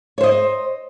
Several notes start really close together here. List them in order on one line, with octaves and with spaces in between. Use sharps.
C#5 C5 D#5